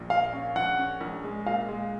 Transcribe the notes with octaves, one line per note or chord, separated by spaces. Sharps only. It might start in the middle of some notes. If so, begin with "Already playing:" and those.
Already playing: A#1 A#2
A#2 F5
C#4
A#1 F#5
C#4
A#1
G#3
A#2 F5
G#3